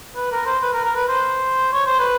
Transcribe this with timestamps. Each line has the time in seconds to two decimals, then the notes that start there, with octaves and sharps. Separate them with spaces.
0.16 B4
0.31 A#4
0.46 C5
0.62 B4
0.73 A#4
0.84 A#4
0.96 B4
1.08 C5
1.73 C#5
1.86 C5
1.99 B4